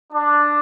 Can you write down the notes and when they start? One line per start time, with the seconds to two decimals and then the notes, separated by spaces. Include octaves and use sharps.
0.13 D4